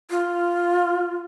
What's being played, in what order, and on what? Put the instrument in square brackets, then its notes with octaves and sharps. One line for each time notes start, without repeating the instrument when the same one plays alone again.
[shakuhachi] F4